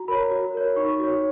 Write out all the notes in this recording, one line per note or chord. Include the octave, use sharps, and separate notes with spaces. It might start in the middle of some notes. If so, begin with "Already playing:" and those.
Already playing: F#4 A#5
A#4 C#5 B5
F#4
A#4 C#5
D#4 C#6
F#4 C#5